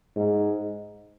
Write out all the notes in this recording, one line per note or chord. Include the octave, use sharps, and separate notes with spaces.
G#2